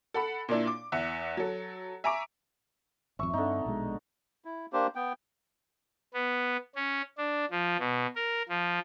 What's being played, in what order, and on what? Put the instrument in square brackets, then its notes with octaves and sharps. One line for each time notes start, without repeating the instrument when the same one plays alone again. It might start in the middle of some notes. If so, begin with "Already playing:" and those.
[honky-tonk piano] A4 F#5 B5
A#2 A#3 D4 E4
D6
E2 E5 F#5 F#6
F#3 A4
E5 G#5 A#5 C#6 D6 D7
[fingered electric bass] G#1 F2 [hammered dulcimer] E5 C#6
[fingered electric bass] G2 C4 [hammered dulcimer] D3 D#4
[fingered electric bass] A#1 B2 G#3
[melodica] E4
A#3 D4 G4 C5
B3 G5
[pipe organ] B3
C#4
D4
F3
B2
A#4
F3